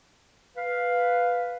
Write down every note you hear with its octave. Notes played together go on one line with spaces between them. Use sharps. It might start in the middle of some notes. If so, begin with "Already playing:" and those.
B4 F5